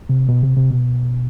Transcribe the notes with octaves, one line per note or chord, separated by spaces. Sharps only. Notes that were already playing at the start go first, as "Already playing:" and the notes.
C3
B2
C3
C3
B2